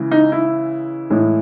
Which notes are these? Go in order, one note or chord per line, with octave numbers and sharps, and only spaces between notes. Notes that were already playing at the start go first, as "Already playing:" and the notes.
Already playing: C#3 E3 G#3
D#4
E4
A2 E3 G#3